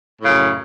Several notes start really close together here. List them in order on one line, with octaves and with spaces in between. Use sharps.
A2 C#3 F#2